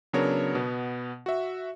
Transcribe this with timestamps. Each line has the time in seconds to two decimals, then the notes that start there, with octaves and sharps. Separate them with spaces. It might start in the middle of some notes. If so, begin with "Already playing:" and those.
0.13 C#3 F#3 B3 D4 A#4 C#5
0.55 B2 B3
1.26 F#4 E5